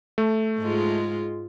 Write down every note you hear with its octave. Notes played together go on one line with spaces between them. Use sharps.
A3
G#2 G#3 F4